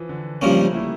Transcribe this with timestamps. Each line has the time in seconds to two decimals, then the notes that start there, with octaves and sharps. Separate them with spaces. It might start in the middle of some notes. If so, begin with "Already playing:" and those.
Already playing: E3 F3
0.09 D3
0.42 G2 C#3 F3 A#3 C#4
0.50 G3
0.58 A3
0.66 A#3
0.75 E4